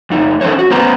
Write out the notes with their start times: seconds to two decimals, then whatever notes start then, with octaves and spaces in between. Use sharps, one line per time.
0.10 F2 D#4
0.41 C#4 A4 C5 C#5
0.59 F#4
0.71 B3 C#4 B4 C5 A#5